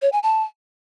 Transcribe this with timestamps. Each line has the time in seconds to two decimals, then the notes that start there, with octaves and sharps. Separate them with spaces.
0.02 C#5
0.12 G#5
0.23 A5